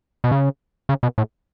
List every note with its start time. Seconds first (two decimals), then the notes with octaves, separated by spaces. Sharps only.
0.24 B2
0.32 C#3
0.89 C#3
1.03 B2
1.18 A2